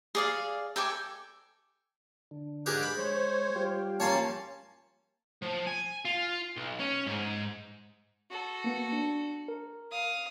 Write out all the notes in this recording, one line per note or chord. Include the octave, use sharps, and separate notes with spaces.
G#4 D5 F5
A4 G5 G#5 D6
D3
G#2 G4 G#4 A#4 D6 F#6
B5
G#3 C5 C#5
G3 F4 G4
A#3 C#4 C#5 F5 A5 C6
F3
G#5
F4
B1
C#4
G#2
F#4 A4
A#3 B3
D4
A#4
F5 D#6